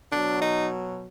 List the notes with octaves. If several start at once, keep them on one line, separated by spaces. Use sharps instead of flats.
B2 F#3 D4
D#4